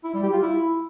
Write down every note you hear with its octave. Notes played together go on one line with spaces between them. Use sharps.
E4
G3
G4
F4
E4